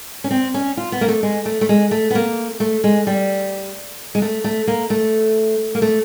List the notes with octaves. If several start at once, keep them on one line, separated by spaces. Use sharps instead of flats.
C#4
C4
C#4
F4
B3
A#3
A3
G#3
A3
A3
G#3
A3
B3
A#3
A3
G#3
G3
G#3
A3
A3
A#3
A3
A#3
A3